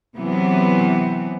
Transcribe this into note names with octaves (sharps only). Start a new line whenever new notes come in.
C3 E3 F#3 B3